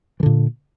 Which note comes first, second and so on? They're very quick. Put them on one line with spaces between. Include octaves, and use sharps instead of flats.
E3 D3 A#2